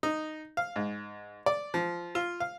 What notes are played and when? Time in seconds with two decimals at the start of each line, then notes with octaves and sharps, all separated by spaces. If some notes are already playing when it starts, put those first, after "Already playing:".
0.03 D#4
0.57 F5
0.76 G#2
1.46 D5
1.74 F3
2.15 F4
2.40 F5